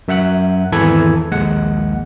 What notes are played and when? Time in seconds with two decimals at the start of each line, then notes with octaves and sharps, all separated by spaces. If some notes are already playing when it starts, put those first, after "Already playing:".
0.08 F#2 E5 F#5 F#6
0.72 G#1 E2 E3 A4 B5 G#6
1.31 A#1 D#2 G#3 F#5